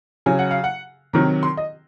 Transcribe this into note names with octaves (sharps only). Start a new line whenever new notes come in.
C#3 F#3 G#5
F#5
F5
F#5
C3 D#3 F#3 A#5
C6
D#5